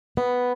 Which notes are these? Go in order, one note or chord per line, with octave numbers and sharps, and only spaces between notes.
B3